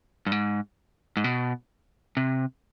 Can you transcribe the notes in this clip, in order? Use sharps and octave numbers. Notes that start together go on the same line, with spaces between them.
G2
G#2
G#2
B2
C3